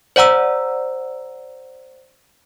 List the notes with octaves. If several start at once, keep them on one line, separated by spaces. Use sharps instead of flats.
C5 D5 F#5 A#5 E6